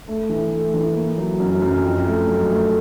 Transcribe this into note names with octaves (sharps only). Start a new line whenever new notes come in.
A3
E3
A3
E3
A#3
F#3
F#2
F#2
F2
A3
F#3
A3